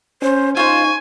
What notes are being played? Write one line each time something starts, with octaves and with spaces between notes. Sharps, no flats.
C#4 C5
D#4 F4 C5 G#5 C#6